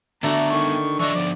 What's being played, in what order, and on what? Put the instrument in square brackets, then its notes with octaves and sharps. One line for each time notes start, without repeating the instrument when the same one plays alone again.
[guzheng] D3 A3 F#4 [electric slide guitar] B3 D4 D5 [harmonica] A#5
[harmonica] D#3 C#6
[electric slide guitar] E3 F3 D#5 [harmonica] D4 E5 C#6
[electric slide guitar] F3 B3 [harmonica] D5